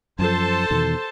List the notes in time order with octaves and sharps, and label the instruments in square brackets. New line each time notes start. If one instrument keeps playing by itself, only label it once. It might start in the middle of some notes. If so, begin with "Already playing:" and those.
[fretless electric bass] F#2 F3 [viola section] A4 C5 A5
[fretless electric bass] E2 B2 D#3